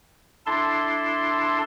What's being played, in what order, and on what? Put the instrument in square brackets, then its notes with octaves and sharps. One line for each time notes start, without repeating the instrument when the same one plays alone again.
[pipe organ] D4 E4 A4 A5 C6